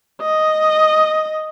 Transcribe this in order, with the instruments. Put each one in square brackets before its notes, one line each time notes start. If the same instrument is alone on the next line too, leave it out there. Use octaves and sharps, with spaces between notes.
[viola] D#5